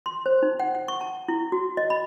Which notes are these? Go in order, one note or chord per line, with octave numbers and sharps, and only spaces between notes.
C6
C5
D#4
F#5
F#5
C#6
A5
E4
F#4
D#5
B5